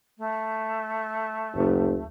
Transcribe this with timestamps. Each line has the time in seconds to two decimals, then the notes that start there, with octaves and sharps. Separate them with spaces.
0.18 A3
1.55 F#1 D2